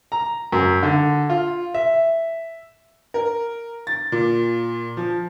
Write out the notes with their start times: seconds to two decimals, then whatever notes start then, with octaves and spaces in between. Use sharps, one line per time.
0.12 A#5
0.52 F#2
0.83 D3
1.30 F4
1.74 E5
3.14 A#4
3.87 A6
4.12 A#2
4.97 F3